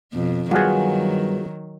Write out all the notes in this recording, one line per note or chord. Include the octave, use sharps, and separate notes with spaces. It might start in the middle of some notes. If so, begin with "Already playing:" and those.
F2 B2
G2 D#3 F#3 B3 F4 F#4 G#4